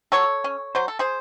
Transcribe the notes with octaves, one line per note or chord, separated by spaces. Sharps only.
F#3 A4 C#5
C#4
F#3 C5
A4
G#4 C5